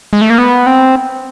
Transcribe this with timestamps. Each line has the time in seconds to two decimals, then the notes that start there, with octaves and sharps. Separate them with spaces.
0.13 G#3
0.21 A3
0.30 A#3
0.38 B3
0.66 C4